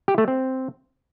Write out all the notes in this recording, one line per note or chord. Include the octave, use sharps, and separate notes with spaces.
G4
A3
C4